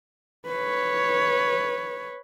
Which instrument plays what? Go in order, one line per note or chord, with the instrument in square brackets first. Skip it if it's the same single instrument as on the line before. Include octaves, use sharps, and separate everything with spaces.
[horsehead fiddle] B4 C#5